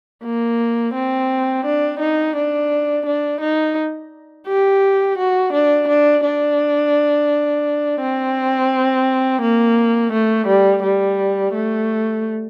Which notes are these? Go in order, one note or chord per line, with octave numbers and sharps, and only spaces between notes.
A#3
C4
D4
D#4
D4
D4
D#4
G4
F#4
D4
D4
D4
C4
A#3
A3
G3
G3
A3